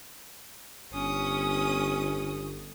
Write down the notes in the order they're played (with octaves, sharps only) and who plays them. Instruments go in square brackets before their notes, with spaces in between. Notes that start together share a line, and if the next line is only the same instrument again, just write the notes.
[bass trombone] G1 [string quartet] C#4 D#6